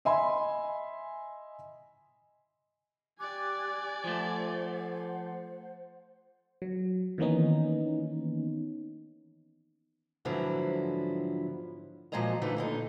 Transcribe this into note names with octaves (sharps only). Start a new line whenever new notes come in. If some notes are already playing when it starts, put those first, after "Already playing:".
D#5 E5 G#5 B5 C6
G4 D5 G#5 D6 F#6
F3 A3 C5 F#5
F#3
D#3 E3 A#3 B3 C#4 D#4
G#2 D3 F3 F#3 B3 E4
A#2 F3 F#3 G#3 D#5 A#5
D3 E3 A3 D#4
A#2 D3 D#4